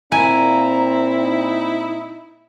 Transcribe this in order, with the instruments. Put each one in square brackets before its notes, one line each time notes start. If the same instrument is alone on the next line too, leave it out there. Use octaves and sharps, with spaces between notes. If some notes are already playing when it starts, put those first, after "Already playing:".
[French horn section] A#2 C4 [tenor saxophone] E4 [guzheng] G#5 [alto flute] A#5
[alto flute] D#4